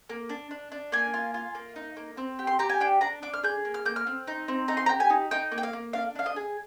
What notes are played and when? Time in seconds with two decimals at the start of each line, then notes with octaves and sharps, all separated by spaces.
0.09 A#3
0.29 D4
0.51 D4
0.72 D4
0.92 A#3 G#5
1.14 F4
1.34 F4
1.55 A#3
1.76 D#4
1.97 A#3
2.17 C4
2.39 G4
2.47 C6
2.59 G4 A#5
2.69 G#5
2.80 D4 G5
3.01 D4 A#5
3.22 D4 D6
3.34 F6
3.44 G#4 G6
3.65 A#3
3.74 F6
3.85 A#3 G6
3.96 F6
4.07 C4
4.27 D#4
4.48 C4
4.68 D#4 A#5
4.77 C6
4.86 A#5
4.89 G4
5.00 G#5
5.10 D#4
5.31 D#4 G5
5.52 A#3
5.58 G5
5.63 F5
5.73 A#3
5.93 D4 F5
6.15 D4 F5
6.26 D#5
6.36 G#4